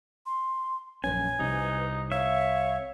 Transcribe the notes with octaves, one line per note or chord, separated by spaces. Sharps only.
C6
A#1 F#2 C#4 B4 G#5
C2 C3 D#4
C#5 E5 F5